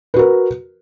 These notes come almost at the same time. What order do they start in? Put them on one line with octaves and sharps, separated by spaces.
B4 F#4 A#4